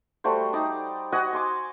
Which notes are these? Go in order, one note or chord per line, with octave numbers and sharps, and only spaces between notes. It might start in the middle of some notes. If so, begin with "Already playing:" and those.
G3 A3 F#4 C5
D#4 G4 D5 A#5
F#4 D#5 F#5 G#5
G#5 C6 D6